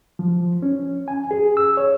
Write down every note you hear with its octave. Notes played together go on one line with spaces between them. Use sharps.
F3
C#4
G#5
G#4
E6
C#5